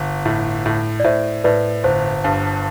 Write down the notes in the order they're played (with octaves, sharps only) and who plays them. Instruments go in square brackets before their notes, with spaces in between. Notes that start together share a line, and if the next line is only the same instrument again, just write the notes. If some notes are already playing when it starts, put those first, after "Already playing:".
Already playing: [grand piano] G1
A2
A2
[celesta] D5
[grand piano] A2 [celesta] C5 E5
[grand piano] A2 [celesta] B4 D5
[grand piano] G1 [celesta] C5
[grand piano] G2